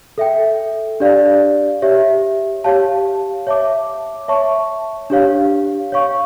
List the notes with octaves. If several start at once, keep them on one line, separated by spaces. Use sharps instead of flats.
A4 E5 G5
D4 G4 D5 F5
G4 C#5 E5
G4 C#5 F5 A5
C#5 E5 A5 D6
C#5 E5 A5 C#6
D4 G4 C#5 F5
C#5 F5 C#6